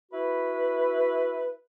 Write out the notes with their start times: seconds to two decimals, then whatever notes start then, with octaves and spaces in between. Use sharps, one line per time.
0.12 E4 F#4 B4